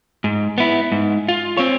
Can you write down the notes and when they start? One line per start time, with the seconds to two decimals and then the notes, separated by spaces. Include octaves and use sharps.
0.24 G#2
0.58 B3 E4
0.92 G#2
1.29 F4
1.57 C4 C#5